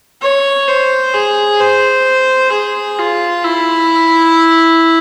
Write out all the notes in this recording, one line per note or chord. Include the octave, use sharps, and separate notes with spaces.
C#5
C5
G#4
C5
G#4
F4
E4